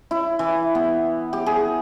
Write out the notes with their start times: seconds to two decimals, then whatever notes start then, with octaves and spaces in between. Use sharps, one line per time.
0.11 E4
0.39 E3
0.75 B3
1.33 G4
1.46 G#4